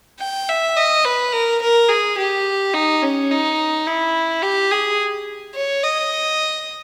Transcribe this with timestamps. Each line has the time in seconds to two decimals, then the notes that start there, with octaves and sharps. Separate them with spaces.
0.20 G5
0.49 E5
0.76 D#5
1.05 B4
1.32 A#4
1.62 A#4
1.89 G#4
2.18 G4
2.74 D#4
3.02 C#4
3.30 D#4
3.86 E4
4.42 G4
4.71 G#4
5.55 C#5
5.83 D#5